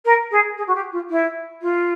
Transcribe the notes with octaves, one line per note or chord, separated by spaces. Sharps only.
A#4
G#4
G#4
F#4
G4
F4
E4
F4